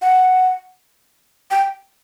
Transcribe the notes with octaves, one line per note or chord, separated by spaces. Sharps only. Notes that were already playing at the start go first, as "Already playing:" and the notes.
F#5
G5